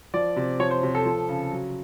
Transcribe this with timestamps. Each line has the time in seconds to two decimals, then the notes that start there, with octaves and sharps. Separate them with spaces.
0.14 F3 D5
0.36 C3
0.59 F3 C#5
0.71 C5
0.83 C3
0.95 A4
1.05 F3
1.29 C#3
1.51 F#3